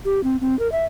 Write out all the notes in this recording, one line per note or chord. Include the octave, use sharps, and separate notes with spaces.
G4
C4
C4
A#4
E5